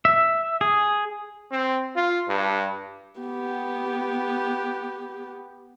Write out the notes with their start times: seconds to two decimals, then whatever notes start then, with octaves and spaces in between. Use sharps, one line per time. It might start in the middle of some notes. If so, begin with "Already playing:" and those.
0.05 E5
0.61 G#4
1.51 C4
1.96 F4
2.28 G2
3.21 B3 G4